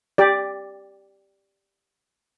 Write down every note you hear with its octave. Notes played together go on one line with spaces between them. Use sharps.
G4 D5